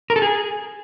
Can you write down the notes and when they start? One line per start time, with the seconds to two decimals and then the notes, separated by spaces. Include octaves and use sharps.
0.10 A#4
0.16 A4
0.22 G#4